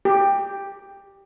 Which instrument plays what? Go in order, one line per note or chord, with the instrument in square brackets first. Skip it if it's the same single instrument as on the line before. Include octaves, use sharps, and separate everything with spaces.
[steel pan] G4